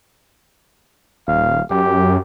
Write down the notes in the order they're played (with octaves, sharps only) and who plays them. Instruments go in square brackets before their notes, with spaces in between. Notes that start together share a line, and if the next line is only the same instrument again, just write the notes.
[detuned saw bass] D#1 [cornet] F5
[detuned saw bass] F#2 [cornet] G4